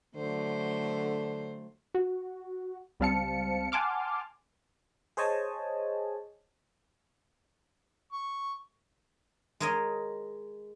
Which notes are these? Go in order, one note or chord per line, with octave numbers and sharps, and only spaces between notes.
D3 F#3 A3 C5
F#4
C#2 G3 C4 F5 A5 C#7
F#5 G#5 A5 C6 D6 F6
G#4 C5 C#5 D#5 G#5 A5
C#6
G#3 G#4 A#4 C#5 D#5